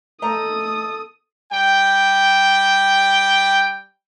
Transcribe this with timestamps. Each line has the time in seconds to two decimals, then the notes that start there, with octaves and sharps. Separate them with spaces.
0.22 A3 A4 D#5 A#5 D#6
1.52 G3 G5